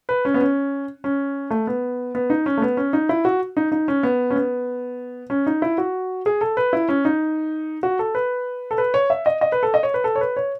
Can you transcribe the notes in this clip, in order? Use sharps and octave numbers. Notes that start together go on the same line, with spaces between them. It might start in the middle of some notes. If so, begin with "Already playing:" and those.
B4
C#4
B3
C#4
C#4
A3
B3
B3
D#4
C#4
A3
B3
C#4
D#4
E4
F#4
D#4
D#4
C#4
B3
C#4
B3
C#4
D#4
E4
F#4
G#4
A4
B4
E4
C#4
D#4
F#4
A4
B4
A4
B4
C#5
E5
D#5
D#5
B4
A4
D#5
C#5
B4
A4
C#5
B4
C#5